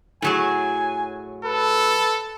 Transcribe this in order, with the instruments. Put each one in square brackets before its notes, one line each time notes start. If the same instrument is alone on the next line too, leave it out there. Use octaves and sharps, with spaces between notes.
[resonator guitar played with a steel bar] A2 F#3 G#4 [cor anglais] G#5
[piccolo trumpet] A4 [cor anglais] B4